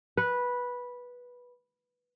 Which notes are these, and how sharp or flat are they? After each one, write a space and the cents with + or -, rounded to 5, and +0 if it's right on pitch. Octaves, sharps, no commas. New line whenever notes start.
B4 -10